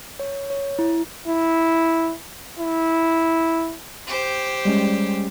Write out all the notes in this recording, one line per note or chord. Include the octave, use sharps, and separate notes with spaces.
C#5
C#5
E4
E4
E4
G4 C5
G3 G#3 C#4